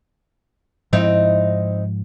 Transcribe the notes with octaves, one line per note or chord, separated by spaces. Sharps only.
G#2 F3 C4 D#4 E4